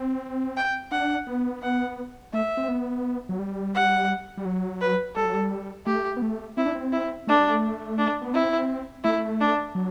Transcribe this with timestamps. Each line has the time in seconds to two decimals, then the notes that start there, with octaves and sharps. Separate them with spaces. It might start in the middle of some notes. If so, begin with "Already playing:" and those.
Already playing: C4
0.57 G5
0.91 D4 F#5
1.27 B3
1.62 F#5
2.33 A3 E5
2.57 C4
2.68 B3
3.29 F#3
3.39 G3
3.75 F#5
4.37 G3
4.45 F#3
4.81 B4
5.15 G3 A4
5.25 F#3
5.34 G3
5.86 A3 G4
6.17 B3
6.22 A3
6.57 C4 E4
6.66 D4
6.75 C4
6.92 E4
7.27 A3 D4
7.38 G3
7.48 A3
7.98 D4
8.22 B3
8.33 C4 E4
9.04 A3 E4
9.40 D4
9.75 F#3